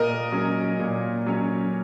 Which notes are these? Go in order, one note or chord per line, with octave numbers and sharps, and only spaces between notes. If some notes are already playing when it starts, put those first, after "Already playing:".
Already playing: A#2 A#4 D#5
F#3 C#4
A#2
F#3 C#4